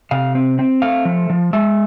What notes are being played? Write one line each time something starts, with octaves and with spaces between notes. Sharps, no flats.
C3 F5
C4
C4
A3 F5
F3
F3
G#3 E5